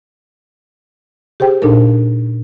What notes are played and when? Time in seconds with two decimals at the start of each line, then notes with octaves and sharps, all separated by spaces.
1.40 G4 G#4 C5 G5
1.62 A#2 D4 D#4 A4 A#4